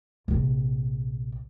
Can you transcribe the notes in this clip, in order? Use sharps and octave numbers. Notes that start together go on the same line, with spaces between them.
A#1 C3